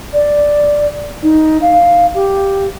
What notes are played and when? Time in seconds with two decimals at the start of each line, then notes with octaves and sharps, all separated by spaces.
0.13 D5
1.22 D#4
1.61 F5
2.13 G4